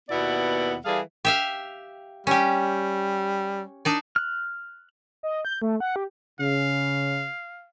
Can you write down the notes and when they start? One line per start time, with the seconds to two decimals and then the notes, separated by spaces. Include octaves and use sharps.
0.10 D#2 B2 B3 E4 D5 F#5
0.84 E3 G3 G#4 A4 F5
1.25 G4 E5 F5
2.27 G3 C#4 G4
3.85 D4 D#4 D5
4.16 F6 F#6
5.23 D#5
5.45 G6
5.62 A3
5.80 F#5
5.96 G4
6.40 C#3 F5